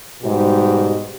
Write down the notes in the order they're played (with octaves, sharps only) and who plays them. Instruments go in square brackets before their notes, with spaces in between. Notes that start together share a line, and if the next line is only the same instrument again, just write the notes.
[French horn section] G#2 B2 G3 G4